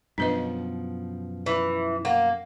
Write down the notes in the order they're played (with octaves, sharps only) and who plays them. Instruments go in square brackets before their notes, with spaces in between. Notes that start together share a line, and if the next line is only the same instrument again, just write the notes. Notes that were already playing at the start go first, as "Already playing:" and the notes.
[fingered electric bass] F#2 B2 F3 [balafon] D4 B4 D#5
[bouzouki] E3
[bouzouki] A#3 [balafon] F#5